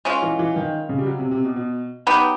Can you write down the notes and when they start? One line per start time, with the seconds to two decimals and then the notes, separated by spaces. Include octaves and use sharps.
0.05 G#3 C#4 F4
0.22 E3
0.39 E3
0.56 D#3
0.89 C#3
0.98 G3
1.06 F#3
1.19 C3
1.31 C3
1.44 B2
1.56 B2
2.07 F#3 B3 D#4 G4